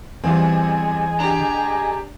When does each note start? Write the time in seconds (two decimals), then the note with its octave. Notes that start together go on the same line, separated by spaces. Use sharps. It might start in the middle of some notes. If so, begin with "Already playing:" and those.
0.24 E2 G3 C4 F4 G#4 D#5 G#5
1.20 D4 G4 A#5